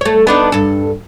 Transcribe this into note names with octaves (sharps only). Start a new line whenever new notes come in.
A3 C#5
B3 D4 D#4
G2 A4